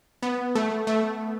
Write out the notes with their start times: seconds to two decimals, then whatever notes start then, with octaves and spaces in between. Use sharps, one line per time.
0.22 B3
0.55 A3
0.87 A3